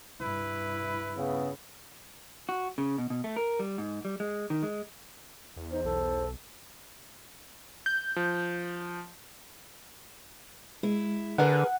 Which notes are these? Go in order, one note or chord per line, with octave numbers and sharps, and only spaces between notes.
G2 E4 B4
C#3 B3
F#4
C#3
B2
B2
A3
A#4
G3
G#2
G3
G#3
D#3
G#3
E2
D#4 C5
B1 A4
G6
F3
G#3 E4
D3 G#4 A#4 B4 F#5